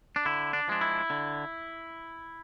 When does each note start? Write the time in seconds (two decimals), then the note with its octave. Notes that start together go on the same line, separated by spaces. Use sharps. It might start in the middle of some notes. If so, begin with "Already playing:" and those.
0.16 D4
0.26 D3 E4
0.53 D4
0.68 F3 G#3 D4
0.81 E4
1.10 D3